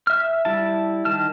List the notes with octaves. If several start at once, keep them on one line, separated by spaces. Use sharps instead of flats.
E5 F6
G3 E4 A5
D#3 A5 F6